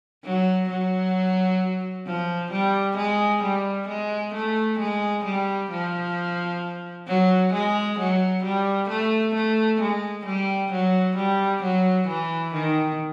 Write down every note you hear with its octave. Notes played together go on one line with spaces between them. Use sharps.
F#3
F#3
F3
G3
G#3
G3
G#3
A3
G#3
G3
F3
F#3
G#3
F#3
G3
A3
A3
G#3
G3
F#3
G3
F#3
E3
D#3